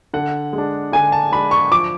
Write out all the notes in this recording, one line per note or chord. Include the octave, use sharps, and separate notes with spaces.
D3 F#5
G#3
D4
D3 G#5
A5
G#3 D4 B5
C#6
F3 D6